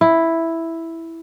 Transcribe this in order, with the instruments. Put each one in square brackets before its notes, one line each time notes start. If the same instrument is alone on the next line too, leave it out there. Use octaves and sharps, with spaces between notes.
[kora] E4